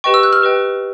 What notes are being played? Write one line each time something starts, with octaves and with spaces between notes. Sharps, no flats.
G4 B4 D#5 G5 C#6
E6
F#6
F6
G4 B4 D#5 G5